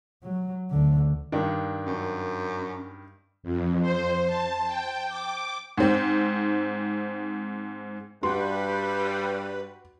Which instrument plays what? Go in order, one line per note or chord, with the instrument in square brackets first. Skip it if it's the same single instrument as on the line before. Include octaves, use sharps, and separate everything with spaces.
[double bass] F#3
D2 D3
[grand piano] G2 D#3 D4
[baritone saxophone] F#2
[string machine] F2
C5
A5
G5
D6
[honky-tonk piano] G#2 C4
[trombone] G2 [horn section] G3 [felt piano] F#4 C6 [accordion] B4